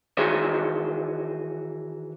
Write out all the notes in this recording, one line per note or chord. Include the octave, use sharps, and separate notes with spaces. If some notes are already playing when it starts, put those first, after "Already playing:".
D#3 E3 F#4 G#4 C5 C#5